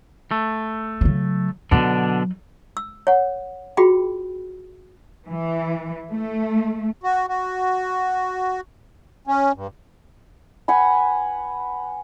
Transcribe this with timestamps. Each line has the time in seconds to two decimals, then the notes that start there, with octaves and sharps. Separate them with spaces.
0.31 A3
1.01 C#3 F#3
1.71 B2 D3 F#3 D4 D#4
2.77 E6
3.07 C#5 F#5
3.77 F4 F#4 G#4 G5 B5
5.28 E3
6.11 A3
7.03 F#4
7.28 F#4
9.27 C#4
9.56 G2
10.68 B4 F#5 G#5 B5